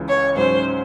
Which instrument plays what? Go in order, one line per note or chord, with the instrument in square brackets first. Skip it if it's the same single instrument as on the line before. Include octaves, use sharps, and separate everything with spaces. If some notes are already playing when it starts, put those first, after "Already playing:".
Already playing: [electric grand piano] C#2 C#3 E3
[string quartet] C#5
[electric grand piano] G#2 F#3 C#4 [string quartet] C5